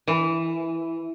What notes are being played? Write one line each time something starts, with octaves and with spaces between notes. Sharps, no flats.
E3